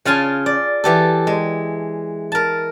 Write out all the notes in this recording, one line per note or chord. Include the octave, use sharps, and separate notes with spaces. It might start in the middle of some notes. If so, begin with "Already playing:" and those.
C#3 F4 F5 G#5 A5
D5
E3 G4 A4
G#3
A#4 A5